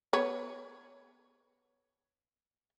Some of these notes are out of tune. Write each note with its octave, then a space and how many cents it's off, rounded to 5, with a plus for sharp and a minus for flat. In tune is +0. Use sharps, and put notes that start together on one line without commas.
B3 +0 C#5 +0